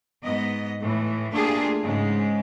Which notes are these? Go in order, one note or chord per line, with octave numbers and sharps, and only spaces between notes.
G#2 B3 D#5
A2 E3
A3 A#3 D4 F4 G4 G#4
G#2 C#3 G#3